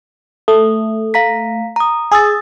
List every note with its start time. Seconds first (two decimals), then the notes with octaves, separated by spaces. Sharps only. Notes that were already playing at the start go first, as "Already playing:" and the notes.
0.48 A3 D#6
1.14 F5 A#5 B6
1.76 A#5 D#6
2.12 G#4 D#6 E6 A6